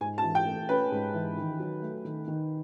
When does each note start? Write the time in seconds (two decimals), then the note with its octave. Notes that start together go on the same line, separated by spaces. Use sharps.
0.01 G#2 G#5
0.18 A5
0.24 E3
0.35 G5
0.47 A3
0.69 C#4 B4
0.92 G#2
1.14 E3
1.37 D#3
1.59 F#3
1.82 A3
2.05 D#3
2.28 D#3